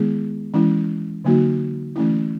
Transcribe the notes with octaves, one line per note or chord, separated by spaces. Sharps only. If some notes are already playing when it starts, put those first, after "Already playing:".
Already playing: D#3 G#3 B3 E4 G#4
E3 G#3 C#4 E4
D3 F#3 A#3 D#4 F#4
E3 A3 C#4 E4